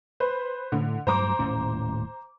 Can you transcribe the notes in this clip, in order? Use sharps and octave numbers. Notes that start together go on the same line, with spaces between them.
B4 C5
A2 D3
G2 F#3 A3 C5 A#5 D6
D#1 A2 C#4